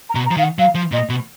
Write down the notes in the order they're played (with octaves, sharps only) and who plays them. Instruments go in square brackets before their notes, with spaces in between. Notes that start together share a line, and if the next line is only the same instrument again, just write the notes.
[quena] A#5
[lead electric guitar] B2
[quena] A#5
[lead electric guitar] F3
[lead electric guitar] D#3 [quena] F5
[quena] F#5
[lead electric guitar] F#3 [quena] F5
[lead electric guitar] F3
[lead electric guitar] A#2 [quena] D#5
[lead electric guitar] B2